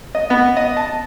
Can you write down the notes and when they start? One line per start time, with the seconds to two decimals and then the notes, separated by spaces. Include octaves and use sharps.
0.15 D#5
0.30 B3
0.57 D#5
0.77 A5